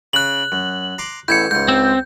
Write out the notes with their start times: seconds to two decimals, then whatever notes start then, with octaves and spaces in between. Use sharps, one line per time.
0.13 C#3 F#6 F#7
0.52 F#2
0.98 A#5 C6 D6
1.28 A1 E2 E4 G6 G#6 C#7
1.51 C#2 G#2 G6
1.68 C4